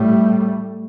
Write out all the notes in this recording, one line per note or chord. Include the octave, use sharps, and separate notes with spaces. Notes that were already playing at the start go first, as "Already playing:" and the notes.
Already playing: A2 G3 A3